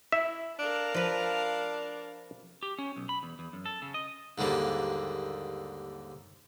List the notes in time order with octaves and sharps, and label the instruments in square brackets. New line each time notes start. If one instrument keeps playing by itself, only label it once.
[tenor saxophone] E4 [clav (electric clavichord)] E5
[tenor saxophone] D4 [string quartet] A#4 F5 A5
[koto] F3 B4 [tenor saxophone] D4
[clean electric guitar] G4
C#4
B1
B5
E2
E2
F#2
A4
C#3
D#5
[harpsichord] D#2 G#2 D3 G3 A#3